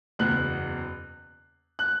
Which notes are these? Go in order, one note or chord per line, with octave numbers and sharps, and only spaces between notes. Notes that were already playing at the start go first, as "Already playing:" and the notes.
F#1 E2 B2 F#6
F#6